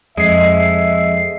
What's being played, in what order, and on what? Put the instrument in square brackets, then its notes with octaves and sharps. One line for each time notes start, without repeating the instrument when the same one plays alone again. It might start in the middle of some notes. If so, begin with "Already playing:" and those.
[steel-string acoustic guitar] F2 [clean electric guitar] G#3 [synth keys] D#5 C7 [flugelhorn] E5